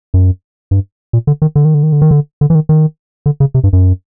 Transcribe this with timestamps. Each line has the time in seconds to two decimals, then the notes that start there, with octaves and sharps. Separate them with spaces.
0.14 F#2
0.71 G2
1.13 A#2
1.27 D3
1.42 D#3
1.56 D3
1.65 D#3
1.74 D3
1.83 D#3
1.92 D3
2.02 D#3
2.11 D3
2.41 D3
2.50 E3
2.55 D#3
2.69 D#3
3.26 D3
3.40 C#3
3.54 C3
3.64 G2
3.73 F#2